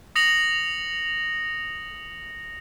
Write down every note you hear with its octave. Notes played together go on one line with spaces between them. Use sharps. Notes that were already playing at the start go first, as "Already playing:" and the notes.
D#6 A#6 C#7 F7 F#7